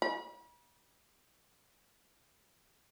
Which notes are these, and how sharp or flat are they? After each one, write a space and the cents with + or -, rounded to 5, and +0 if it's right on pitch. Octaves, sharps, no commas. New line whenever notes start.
B5 -40